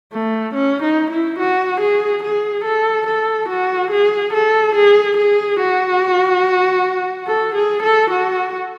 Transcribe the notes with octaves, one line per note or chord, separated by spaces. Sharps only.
A3
C#4
D#4
E4
F#4
G#4
G#4
A4
A4
F#4
G#4
A4
G#4
G#4
F#4
A4
G#4
A4
F#4